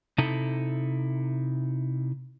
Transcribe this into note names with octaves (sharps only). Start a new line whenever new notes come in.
C3 D#4 E4 A4